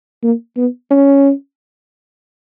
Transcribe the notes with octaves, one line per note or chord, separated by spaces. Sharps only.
A#3
B3
C#4